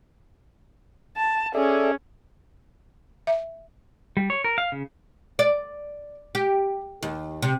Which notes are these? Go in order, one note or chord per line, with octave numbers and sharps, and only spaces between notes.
A5
C#4 G#4 A4 D5 E5
E5
G3
C#5
A#4
F5
C#3
D5
G4
D#2
C3